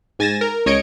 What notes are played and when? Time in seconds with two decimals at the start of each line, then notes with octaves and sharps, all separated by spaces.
0.19 G#2 G#5 A6 A#6 E7
0.41 A#4
0.66 C#2 C#5 D#5 G#6 C#7 D7